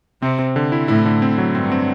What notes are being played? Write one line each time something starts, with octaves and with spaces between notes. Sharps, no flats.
C3 C4
C4
D3
E4
A2 E4
D3
C4
F#3
G2 C4
C4